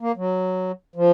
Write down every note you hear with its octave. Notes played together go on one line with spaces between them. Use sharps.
A#3
F#3
F3